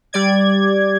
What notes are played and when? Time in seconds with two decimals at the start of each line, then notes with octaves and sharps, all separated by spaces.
0.13 G3 D5 G#6